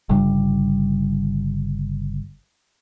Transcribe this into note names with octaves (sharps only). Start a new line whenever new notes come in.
G1 C#3 G3